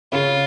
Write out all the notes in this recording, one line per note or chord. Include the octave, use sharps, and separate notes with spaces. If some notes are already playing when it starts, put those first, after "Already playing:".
C#3 C#4 F4